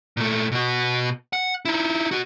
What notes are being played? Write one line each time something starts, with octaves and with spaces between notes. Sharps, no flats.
A#2 A3
B2 F#4
F#5
D#4 E4
B3 F#4